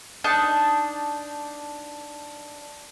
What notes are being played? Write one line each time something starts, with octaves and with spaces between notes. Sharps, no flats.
D4 D#4 A5